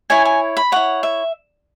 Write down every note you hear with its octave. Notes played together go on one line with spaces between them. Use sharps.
E4 C#5 G#5
G#5
B5
E4 C#5 F#5
E5